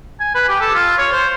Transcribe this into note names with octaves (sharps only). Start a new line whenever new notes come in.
G#5
B4
G4
A4
F4
C#5
C5